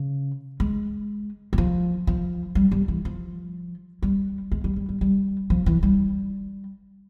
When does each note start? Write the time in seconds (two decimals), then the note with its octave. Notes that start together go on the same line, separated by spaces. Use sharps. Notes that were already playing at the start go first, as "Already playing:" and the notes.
Already playing: C#3
0.60 G#3
1.53 G3
1.58 F3
2.07 F3
2.55 G3
2.72 G3
2.88 E3
3.05 F3
4.02 G3
4.52 G#3
4.64 G3
4.76 G3
4.89 G3
5.01 G3
5.50 F3
5.66 E3
5.83 G3